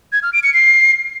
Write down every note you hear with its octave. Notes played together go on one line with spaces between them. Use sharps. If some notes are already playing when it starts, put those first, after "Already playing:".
G#6
F6
D7
C#7
C7